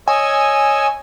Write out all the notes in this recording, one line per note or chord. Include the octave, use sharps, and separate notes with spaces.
C#5 D#5 G#5 E6